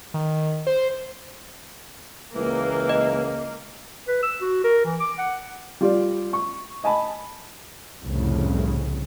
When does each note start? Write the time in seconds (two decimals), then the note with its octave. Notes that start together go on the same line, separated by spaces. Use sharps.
0.14 D#3
0.67 C5
2.35 C#2 E3 A#3
2.89 D#5
4.08 B4
4.22 E6
4.41 F#4
4.64 A#4
4.85 E3
5.00 D6
5.18 F#5
5.81 G3 F4 G4 D5
6.33 C#6
6.84 D#5 G#5 A5 B5
8.03 C2 F2 A2 C#3